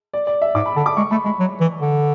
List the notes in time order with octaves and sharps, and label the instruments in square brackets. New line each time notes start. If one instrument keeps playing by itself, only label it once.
[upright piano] D5
D5
E5
[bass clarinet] G#2 [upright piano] D6
[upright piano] B5
[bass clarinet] D3 [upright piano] A5
[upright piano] D6
[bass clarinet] G#3 [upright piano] C#6
[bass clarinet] A3 [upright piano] B5
[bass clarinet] G#3 [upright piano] B5
[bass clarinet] F#3
E3
D3